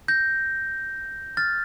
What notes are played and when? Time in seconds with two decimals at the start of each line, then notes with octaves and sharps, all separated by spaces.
0.08 G6 A#6
1.37 F6 A6